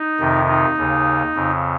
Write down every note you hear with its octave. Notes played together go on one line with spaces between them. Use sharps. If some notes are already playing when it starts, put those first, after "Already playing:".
Already playing: D#4
F2 C3 D#3
D#4
D#2 C#3
F2 C#3